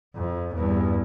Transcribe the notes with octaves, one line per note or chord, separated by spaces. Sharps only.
F2
E2 G2